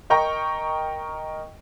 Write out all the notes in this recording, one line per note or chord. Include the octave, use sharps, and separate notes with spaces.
A#4 D#5 G5 A#5 C#6